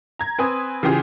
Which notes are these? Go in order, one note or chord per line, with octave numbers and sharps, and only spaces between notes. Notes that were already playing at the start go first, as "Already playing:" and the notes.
A#5 G#6
C4 B4 G#5 D#6
C#3 E3 F4 G4 G#4